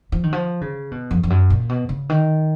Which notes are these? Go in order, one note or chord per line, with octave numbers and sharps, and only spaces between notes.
F3
D#3
F3
C#3
B2
F2
F2
F#2
A#2
B2
C#3
D#3